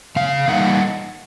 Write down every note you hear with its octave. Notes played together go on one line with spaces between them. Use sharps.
C#3 F5
E3 G3 A#3 D#4 F#5